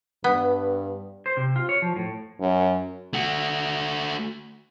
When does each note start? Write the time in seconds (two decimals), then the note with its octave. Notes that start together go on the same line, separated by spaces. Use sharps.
0.24 G2 B3
1.26 C5
1.37 C3
1.56 F4
1.69 C#5
1.82 F3
1.96 A2
2.40 F#2
3.13 A3 F#4